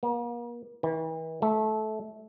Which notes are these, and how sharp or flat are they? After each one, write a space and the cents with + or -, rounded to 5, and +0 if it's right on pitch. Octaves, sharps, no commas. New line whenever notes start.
A#3 +40
E3 -40
A3 -20